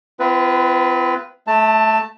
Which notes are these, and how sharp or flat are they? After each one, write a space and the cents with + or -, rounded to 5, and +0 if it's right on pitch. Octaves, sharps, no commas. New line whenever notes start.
C4 -35 F4 -30 B4 +0
A3 -15 A5 +15